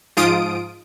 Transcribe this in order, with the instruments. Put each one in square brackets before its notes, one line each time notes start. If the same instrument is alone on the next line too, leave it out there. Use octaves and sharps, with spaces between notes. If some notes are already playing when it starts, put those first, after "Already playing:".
[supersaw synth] G#2 F3 F4 D#6 D7